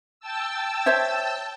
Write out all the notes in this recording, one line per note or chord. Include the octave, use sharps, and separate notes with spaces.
G5 A5 E6
C5 C#5 E5